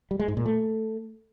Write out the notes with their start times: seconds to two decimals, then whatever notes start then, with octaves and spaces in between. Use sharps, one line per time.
0.11 G3
0.19 G#3
0.28 G#2
0.37 A#2
0.46 A3